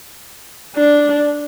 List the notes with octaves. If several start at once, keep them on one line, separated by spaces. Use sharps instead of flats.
D4